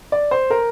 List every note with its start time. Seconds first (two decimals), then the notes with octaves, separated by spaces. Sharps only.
0.12 D5
0.31 C5
0.50 A#4